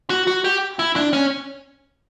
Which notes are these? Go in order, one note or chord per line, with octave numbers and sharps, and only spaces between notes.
F#4
F#4
G4
E4
D4
C#4